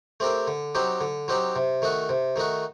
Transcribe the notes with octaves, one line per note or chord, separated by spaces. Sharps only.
A3 C4 G4 A#4
D3
F#3 C4 D#4 G4
D3
F#3 C4 D#4 G4
C3
D#3 A3 D#4 F#4
C3
D#3 A3 D#4 F#4